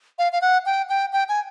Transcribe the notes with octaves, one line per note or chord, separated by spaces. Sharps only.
F5
F5
F#5
G5
G5
G5
G#5